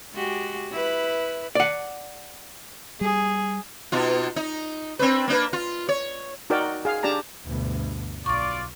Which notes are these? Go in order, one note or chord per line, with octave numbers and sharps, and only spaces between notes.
G#3 F#4 G4
E4 B4
D5 F#5
G3 G#4
B2 D#4 F4
D#4
C4 D4 B4
A#3 D4 B4
F4
C#5
D#4 F#4 A#4 D5 G5
G#4 F5
D4 G4 D5 A5 A#5
D2 G2 B2
B1 F4 D5 C#6 A6